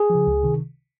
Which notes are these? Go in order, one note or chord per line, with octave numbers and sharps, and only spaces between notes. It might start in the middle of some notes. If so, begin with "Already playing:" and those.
Already playing: G#4
F3
C#3
C#2
C3 D#3